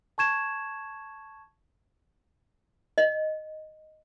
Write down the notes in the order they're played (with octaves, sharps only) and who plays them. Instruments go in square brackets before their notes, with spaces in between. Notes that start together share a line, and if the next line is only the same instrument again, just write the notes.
[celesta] A5 C#6 G#6 E7
[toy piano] D#5